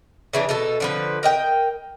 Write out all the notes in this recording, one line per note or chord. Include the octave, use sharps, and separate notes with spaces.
C#3 E3 D4
B2 D#4 A4
D3 F3 B4
A#4 D#5 G5